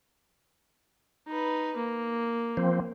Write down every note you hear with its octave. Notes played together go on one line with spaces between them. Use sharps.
D#4 B4
A#3
F3 C4